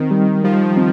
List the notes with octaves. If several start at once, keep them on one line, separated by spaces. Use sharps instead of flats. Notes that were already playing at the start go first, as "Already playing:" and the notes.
Already playing: D#3 C4
G3
F3 G3
C4